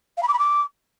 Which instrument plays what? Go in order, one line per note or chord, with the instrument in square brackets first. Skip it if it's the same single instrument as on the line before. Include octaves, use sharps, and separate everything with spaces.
[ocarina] F5
B5
D6
B5
D6